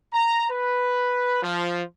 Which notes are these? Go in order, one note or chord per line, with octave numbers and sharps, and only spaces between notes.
A#5
B4
F3